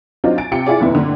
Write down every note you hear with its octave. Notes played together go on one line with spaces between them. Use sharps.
F#3 C4 D4 D#4 F4
G#5 A6 D7
C3 F4 G5 C#7
E4 F4 G#4 D5
F1 D#2 B2 E4 B4
G2 A#2 D3